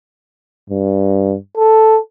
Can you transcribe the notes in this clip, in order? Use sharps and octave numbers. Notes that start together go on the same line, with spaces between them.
G2
A4